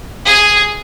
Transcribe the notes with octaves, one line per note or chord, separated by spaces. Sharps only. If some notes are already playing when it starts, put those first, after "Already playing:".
G#4